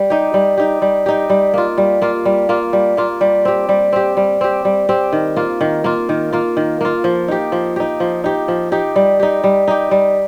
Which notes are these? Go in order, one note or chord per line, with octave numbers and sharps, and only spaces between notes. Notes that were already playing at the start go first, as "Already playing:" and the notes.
Already playing: G3
D#4 G4
G3
D#4 G4
G3
D#4 G4
G3
A#3 F4
G3
A#3 F4
G3
A#3 F4
G3
A#3 F4
G3
C4 G4
G3
C4 G4
G3
C4 G4
G3
C4 G4
D#3
A#3 F4
D#3
A#3 F4
D#3
A#3 F4
D#3
A#3 F4
F3
D#4 G4
F3
D#4 G4
F3
D#4 G4
F3
D#4 G4
G3
D#4 G4
G3
D#4 G4
G3